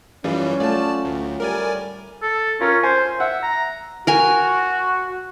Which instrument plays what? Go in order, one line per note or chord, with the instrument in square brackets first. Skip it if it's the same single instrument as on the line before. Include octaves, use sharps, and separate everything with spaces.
[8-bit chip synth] F#2 E3 G3 [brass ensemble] C#4 [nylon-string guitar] F4 G#4
[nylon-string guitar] F#3 A3 F4 [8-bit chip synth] D5 A5
[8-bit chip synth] D2
[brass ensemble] A2 G3 [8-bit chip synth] A#4 D5 G#5
[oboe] A4
[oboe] C#4 [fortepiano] F4 A#4
[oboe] C5 [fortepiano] G#5
[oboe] E5 [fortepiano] F#5
[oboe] A#5
[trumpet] F#4 [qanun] A#4 G#5